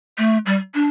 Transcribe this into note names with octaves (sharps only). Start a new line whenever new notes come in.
A3
G3
D4